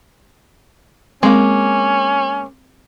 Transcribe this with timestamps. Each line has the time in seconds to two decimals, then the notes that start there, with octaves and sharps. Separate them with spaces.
1.23 G#3 A#3 C4 C#4